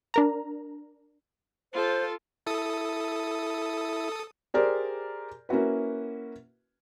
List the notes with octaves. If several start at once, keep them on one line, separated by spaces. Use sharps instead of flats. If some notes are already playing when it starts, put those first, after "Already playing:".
D4 A#4 A#5
F4 A4 C5
E4 A4 D#6
G4 G#4 A#4 C5 D5
A#3 C#4 E4 F#4 B4